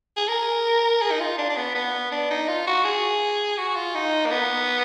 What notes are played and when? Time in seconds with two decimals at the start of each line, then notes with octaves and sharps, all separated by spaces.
0.17 G#4
0.28 A#4
1.02 G#4
1.12 D#4
1.20 F4
1.38 D4
1.50 D4
1.57 B3
1.75 B3
2.12 D4
2.31 D#4
2.48 F4
2.67 F#4
2.85 G#4
3.58 F#4
3.77 F4
3.95 D#4
4.26 A#3
4.31 B3